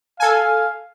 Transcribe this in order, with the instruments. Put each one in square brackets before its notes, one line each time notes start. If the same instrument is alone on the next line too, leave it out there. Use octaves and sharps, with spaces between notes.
[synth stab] A4 G#5 [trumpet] F5